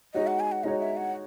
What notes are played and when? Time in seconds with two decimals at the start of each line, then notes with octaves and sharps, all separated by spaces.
0.14 G#3 D#4 F#4 C#5 D#5
0.27 F#5
0.40 G#5
0.52 F#5
0.64 G#3 D#4 F#4 C#5 D#5
0.80 E5
0.97 F#5